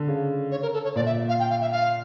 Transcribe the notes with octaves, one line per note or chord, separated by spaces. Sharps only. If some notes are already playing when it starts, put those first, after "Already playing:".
Already playing: D3
C#3
C#5
A#4
A4
C#5
A#2 D5
E5
F5
G5
F5
E5
F5